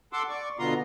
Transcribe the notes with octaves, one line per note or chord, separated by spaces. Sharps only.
A4 F#5 C6 D6 E6
D5 C#6
B2 D3 B3 F4 A#5 C6